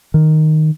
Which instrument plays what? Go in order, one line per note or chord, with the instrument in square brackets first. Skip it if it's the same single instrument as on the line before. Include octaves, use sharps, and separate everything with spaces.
[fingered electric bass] D#3